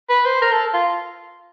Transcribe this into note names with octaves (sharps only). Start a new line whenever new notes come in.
B4
C5
A#4
A4
F4